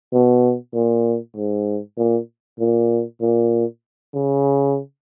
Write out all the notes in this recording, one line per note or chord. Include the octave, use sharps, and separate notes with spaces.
B2
A#2
G#2
A#2
A#2
A#2
C#3